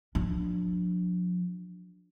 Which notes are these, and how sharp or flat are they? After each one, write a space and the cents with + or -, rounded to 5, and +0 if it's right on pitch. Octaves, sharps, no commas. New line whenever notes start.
F3 +40 D4 +0